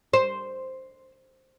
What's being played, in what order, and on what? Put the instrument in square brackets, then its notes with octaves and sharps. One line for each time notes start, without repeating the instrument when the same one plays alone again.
[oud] C5